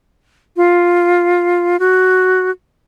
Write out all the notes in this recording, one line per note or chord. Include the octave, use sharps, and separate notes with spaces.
F4
F#4